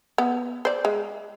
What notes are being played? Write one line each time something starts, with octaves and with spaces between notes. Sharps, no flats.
B3
C5 D5
G#3